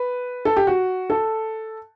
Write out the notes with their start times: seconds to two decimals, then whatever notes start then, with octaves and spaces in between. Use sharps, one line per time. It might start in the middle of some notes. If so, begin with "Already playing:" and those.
Already playing: B4
0.45 A4
0.57 G4
0.67 F#4
1.10 A4